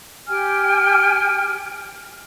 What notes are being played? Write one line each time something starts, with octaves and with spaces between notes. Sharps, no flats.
G4 G5 G#5 F6